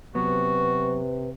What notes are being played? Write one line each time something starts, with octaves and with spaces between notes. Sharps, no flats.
C3 F#3 B3 F#4 B4